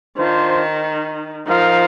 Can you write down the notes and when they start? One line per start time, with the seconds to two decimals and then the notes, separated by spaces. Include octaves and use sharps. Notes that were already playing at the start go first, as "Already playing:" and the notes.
0.18 D#3 D4 F4 C5
1.47 F3 D#4 A#4 F5